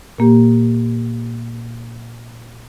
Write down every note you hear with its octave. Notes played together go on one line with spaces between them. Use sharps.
A#2 A#3 G4